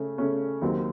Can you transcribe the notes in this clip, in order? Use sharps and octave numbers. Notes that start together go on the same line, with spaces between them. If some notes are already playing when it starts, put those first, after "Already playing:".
Already playing: C#3 A3 C#4
C#3 A3 C#4
D#2 D#3 F#3 C4